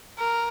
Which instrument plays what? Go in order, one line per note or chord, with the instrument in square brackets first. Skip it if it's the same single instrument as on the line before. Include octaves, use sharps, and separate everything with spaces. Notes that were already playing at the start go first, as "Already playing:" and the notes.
[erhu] A#4